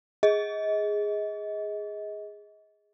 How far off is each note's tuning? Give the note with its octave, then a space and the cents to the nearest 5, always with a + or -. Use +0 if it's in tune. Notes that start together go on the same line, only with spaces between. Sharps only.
G#4 -5 D#5 +30